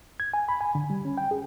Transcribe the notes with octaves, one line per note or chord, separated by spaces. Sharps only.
G#6
G#5
B5
G#5
D3
G3
C#4
G5
G#4